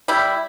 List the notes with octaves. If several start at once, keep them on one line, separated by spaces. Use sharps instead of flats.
G3 E4